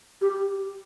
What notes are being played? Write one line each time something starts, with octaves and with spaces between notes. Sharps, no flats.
G4